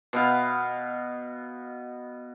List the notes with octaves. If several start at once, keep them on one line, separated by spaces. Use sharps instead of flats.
B2 B3 F5